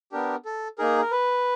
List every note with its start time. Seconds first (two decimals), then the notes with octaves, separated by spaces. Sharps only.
0.12 B3 D4 G4 A#4
0.45 A4
0.78 A#3 D#4 G#4 A#4
1.01 A#4
1.11 B4